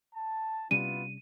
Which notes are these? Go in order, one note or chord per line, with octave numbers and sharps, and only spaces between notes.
A5
C3 G3 B3 C#4 E4 F4 D#7